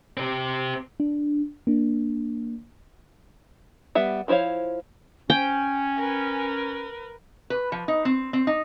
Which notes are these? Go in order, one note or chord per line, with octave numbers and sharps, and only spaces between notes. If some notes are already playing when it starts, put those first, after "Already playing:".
C4 G4
D4
A#3 D4
G3 B3 E5 F#5
F3 E4 C5 C#5 F5
C#4 G5 G#5
A#4 B4
B4
F3
D#4
C4
C4
D#4